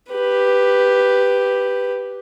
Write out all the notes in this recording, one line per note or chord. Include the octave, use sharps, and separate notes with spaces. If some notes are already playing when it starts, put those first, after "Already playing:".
G4 B4